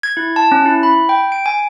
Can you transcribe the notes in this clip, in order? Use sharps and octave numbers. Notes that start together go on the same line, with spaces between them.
G#6
E4
A5
C#4
E4
B5
G5
D7
G#5